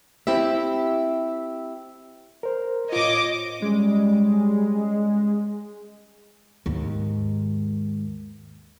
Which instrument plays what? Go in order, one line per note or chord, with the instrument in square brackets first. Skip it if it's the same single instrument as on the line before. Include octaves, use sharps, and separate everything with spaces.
[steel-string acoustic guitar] C4 E4 G4 E5
[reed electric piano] A#4 C5
[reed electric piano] A2 F4 [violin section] C#5 D#5 D6
[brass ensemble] G3 C#4 [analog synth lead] G#3
[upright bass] D#2 G#2